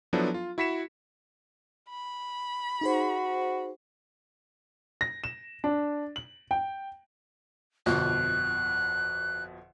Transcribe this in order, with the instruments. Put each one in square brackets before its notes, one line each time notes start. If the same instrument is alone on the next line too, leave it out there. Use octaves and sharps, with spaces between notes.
[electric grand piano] F3 F#3 B3 D4 E4 A4
F4
E4 F#4 B5 B6 C#7 E7
[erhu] B5
[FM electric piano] D#4 G#4 C5 [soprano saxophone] F#4
[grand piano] A#6
E7
D4
F#7
G5
[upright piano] G1 F2 B2 [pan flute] F#6